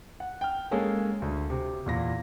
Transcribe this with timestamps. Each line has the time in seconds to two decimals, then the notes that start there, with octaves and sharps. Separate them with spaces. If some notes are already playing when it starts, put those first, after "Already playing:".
0.20 F#5
0.41 G5 F6
0.71 G#3 A#3 C#4 G#4 A4
1.22 D2
1.50 C3
1.86 E2 A#2 A#6